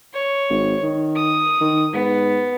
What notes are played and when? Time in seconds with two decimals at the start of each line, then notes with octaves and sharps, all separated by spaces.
0.14 C#5
0.50 G#1
0.83 D#3
1.16 D#6
1.61 D#3
1.94 G#2 B3